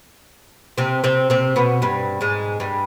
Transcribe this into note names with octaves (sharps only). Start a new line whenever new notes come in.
C3 C4
C3 C4
C3 C4
B2 B3
G2 G3
G#2 G#3
G2 G3